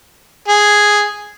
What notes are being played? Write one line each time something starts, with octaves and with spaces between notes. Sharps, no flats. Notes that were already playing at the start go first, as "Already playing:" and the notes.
G#4